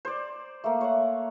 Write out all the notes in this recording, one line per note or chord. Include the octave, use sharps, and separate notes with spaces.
C5 D5
A3 A#3
C#5 F#5